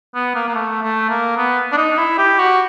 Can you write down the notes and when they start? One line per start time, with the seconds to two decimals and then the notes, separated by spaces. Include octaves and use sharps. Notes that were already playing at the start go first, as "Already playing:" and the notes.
0.14 B3
0.35 A#3
0.48 A#3
0.54 A3
0.83 A3
1.09 A#3
1.37 B3
1.72 D4
1.77 D#4
1.97 E4
2.18 G4
2.38 F#4